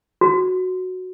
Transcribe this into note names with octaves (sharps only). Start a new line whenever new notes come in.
F#4